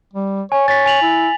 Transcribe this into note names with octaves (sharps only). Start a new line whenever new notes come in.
G3
C#5 G#5
C#5 A6 B6
G#5 F7 F#7
E4